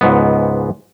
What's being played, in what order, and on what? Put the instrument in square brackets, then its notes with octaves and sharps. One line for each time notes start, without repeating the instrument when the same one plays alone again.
[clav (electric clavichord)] C#2 G#2 B3